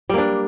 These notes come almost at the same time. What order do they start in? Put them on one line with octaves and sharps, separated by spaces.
G3 A#3 D4